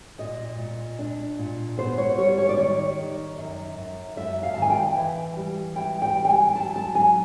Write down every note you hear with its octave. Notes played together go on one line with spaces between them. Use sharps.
A#2 D#5
A#2
D4
A#2
B3 C5
C#5
G3 C#5
C#5
D5
D#3 C#5
D#3
F#2
F#2
F#2 E5
F5
A5
D#3 G#5
G5
E3
G3
E3 G5
G5
G3
G5
G#5
F#3 A5
A5
F#3 G#5